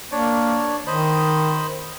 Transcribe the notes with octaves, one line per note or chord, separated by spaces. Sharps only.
A#3 D4 C#5 D5
D#3 C5 D#5 B5